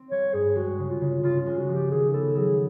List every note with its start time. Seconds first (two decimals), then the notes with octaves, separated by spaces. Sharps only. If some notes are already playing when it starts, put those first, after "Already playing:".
Already playing: C4
0.11 G3 C#5
0.33 G2 G#4
0.56 G#3 F#4
0.78 C#3
0.90 F4
1.01 C#3
1.23 C#3 F4
1.40 F4
1.46 G#3
1.57 F#4
1.68 F3
1.74 G4
1.91 D#3 G#4
2.13 B3 A4
2.36 F#3 G#4